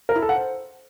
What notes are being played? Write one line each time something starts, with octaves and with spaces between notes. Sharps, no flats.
A#4
E4
A4
F#5
C5